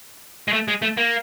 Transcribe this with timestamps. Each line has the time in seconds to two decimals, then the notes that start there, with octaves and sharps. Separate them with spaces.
0.48 G#3
0.53 A3
0.68 G#3
0.82 A3
0.97 A#3